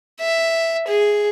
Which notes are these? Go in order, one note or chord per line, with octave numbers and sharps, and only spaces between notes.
E5
G#4